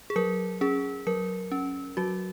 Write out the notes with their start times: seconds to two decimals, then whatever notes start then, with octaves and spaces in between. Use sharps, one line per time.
0.10 G#4
0.16 F#3 A#4
0.61 C#4 G#4
1.07 F#3 A#4
1.52 C#4
1.97 F#3 F#4